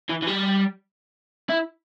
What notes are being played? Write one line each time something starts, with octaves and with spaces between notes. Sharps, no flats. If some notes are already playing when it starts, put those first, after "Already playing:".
E3
E3
G3
E4